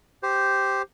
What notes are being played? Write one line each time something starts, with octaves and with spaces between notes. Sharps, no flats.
G4 C5